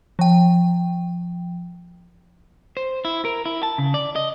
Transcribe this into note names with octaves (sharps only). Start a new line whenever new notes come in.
F3 G5
C5
E4
A#4
E4
A5
C#3
D5
D#5